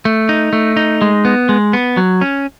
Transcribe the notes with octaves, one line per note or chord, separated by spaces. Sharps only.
A3
D#4
A3
D#4
G#3
B3
G#3
B3
F#3
C#4